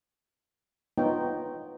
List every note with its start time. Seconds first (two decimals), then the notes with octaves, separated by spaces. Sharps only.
0.98 B3 D#4 F4 C#5 G5